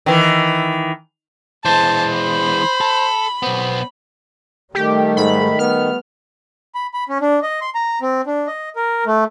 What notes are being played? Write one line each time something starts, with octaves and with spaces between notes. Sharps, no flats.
D#3 E3
E3 G#3 C5 A5
B5
A4
B1 B3 C4
D#3 G3 A3 G4
G#2 B5
B3 F6
B5
B5
C#4
D4
D#5
C6
A#5
C4
D4
D#5
A#4
A3